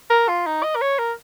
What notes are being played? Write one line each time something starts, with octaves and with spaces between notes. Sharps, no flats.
A#4
F4
D#4
D#5
A#4
C#5
A#4